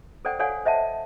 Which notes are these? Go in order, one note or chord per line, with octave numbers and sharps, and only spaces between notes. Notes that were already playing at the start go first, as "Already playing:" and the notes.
A4 C5 D5 F#5 G5
A4 C#5 D5 F5 F#5 G#5
C5 D#5 E5 F#5 G5 A5